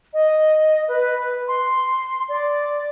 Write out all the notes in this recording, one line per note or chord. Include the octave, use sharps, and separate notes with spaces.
D#5
B4
C6
D5